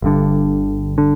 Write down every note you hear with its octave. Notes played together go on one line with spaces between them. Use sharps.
G1 G2 D3
D3